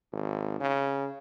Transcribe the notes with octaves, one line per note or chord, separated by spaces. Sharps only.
G#1
C#3